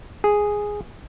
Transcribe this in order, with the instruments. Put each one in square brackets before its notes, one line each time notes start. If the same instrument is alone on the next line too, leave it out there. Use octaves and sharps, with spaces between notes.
[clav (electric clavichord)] G#4